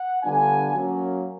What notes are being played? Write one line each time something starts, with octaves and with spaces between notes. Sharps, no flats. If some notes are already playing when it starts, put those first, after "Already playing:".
Already playing: F#5
D3 G3 B3 D4 F4 G#5
F#3 A#3 C#4